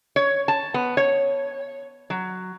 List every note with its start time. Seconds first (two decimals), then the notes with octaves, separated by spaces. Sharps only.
0.16 C#5
0.48 A5
0.74 B3
0.97 C#5
2.10 F#3